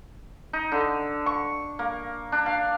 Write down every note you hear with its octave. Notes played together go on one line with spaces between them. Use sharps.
D#4
D3
C#6
A#3
D4
F5